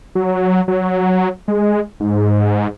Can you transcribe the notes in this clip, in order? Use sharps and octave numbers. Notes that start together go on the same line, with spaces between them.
F#3
F#3
G#3
G#2